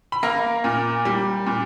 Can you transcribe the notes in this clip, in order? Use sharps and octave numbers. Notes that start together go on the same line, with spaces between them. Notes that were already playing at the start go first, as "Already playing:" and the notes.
B5
A#3 A#4 A#5
A#2
G3
A#2